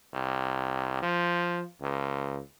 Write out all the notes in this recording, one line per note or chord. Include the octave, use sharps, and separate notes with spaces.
C2
F3
C#2